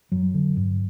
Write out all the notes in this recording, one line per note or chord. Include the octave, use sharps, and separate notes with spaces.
F#2 F#3
D3
G2